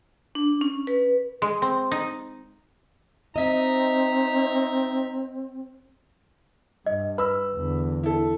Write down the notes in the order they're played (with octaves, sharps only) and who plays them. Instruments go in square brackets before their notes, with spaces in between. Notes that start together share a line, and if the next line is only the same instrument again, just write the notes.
[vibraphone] D4
C#4
B4
[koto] G#3
C4
D#4
[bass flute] C4 [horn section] D#4 E5 A#5 [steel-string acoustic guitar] D#5
[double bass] G2 [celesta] D#5
[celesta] B4 [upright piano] B5 E6
[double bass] E2 D3
[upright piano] E4 A4